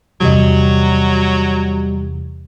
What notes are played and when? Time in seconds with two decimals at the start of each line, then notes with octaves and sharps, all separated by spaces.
0.21 E2 C3 E3 F#3 G3 D#5